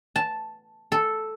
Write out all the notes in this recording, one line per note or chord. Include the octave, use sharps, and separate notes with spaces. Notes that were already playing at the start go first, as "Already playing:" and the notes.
A5
A4